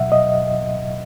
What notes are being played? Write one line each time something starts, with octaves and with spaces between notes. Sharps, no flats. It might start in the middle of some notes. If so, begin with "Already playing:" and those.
Already playing: B2 F#3 E5 F#5
D#5